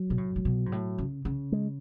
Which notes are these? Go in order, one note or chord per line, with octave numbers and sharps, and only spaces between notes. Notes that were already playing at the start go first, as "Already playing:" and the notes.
Already playing: F#3
B2
A2
A2
B2
G#2
A2
C#3
C#3
G#3